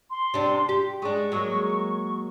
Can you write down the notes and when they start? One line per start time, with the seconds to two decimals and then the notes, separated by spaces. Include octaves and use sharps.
0.10 C6
0.34 C3 D4
0.69 G4
1.02 G#3 D4 C#6
1.32 F#3 G#3 A#3